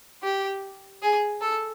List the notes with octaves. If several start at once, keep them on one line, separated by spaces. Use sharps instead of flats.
G4
G#4
A4